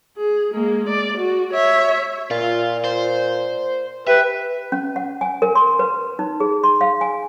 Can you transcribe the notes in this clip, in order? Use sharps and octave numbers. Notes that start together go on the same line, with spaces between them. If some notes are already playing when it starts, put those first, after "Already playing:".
G#4
G#3 A#3
D5
F#4
C#5 E5
A#2 F4
C5
G4 B4 E5
C#4
F#5
G#5
A#4
C6
B4
D#4
G#4
C6
F5
G#5